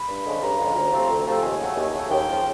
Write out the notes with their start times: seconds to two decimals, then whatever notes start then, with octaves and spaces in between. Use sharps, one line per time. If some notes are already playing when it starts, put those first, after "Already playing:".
Already playing: B5
0.08 G2
0.25 D3 F3 G#3 C#4
0.42 G2 A#5
0.59 D3 F3 G#3 C#4
0.75 D2
0.92 C3 F3 A3 C4
1.10 D2
1.26 C3 F3 A3 C4
1.43 D#2 G#5
1.60 C#3 F#3 A3
1.76 D#2
1.94 C#3 F#3 A3
2.10 D#2 G5
2.28 C#3 F3